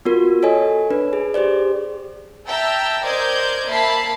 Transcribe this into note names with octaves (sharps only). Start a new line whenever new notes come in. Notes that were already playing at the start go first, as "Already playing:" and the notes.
B3 F4 F#4 A#4
A4 C#5 D#5 G#5
D4 B4
G#4
G4 G#4 C5 D5
E5 G5 A5 A#5 E6
A#4 C5 D5 D#5 G6 G#6
A#3 E5 A5 B5 C7